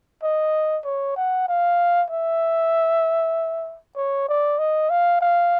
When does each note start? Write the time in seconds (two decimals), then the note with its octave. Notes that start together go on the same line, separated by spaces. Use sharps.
0.23 D#5
0.85 C#5
1.16 F#5
1.48 F5
2.10 E5
3.96 C#5
4.29 D5
4.59 D#5
4.90 F5
5.21 F5